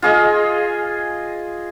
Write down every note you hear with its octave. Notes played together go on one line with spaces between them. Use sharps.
F4 G#4 D#5